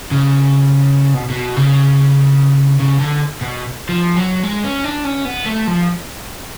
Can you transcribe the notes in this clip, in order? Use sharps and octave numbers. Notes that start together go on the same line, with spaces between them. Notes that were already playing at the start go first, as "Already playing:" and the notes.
C#3
B2
B2
C#3
C#3
D3
B2
F3
F#3
G#3
C#4
D4
C#4
B3
A3
F3